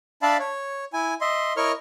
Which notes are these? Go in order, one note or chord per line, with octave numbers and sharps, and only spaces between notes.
D4 D5 E5 F5 A5 B5
C#5
E4 G#5
D#5 E5 C6
E4 A#4 C#5 D#5 C#6 F6